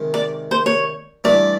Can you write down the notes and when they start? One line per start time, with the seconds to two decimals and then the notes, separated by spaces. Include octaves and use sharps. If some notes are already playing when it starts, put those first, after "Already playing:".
Already playing: C3 D#3 G#3
0.14 D5
0.51 C5
0.66 C#5
1.24 G2 E3 A3 D4 D5